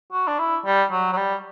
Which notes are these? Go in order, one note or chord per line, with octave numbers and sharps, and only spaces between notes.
F#4
D4
E4
G3
F#3
F#3
G3